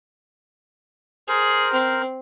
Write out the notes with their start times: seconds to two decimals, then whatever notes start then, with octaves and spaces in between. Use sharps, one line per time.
1.28 G#4 A#4 C5
1.73 C4